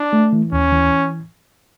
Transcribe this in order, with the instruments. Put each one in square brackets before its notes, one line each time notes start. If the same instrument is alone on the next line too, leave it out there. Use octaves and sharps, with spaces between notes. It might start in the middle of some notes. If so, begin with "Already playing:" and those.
Already playing: [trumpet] D4
[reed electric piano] A3
E3
[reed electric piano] D#2 [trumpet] C#4
[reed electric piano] E3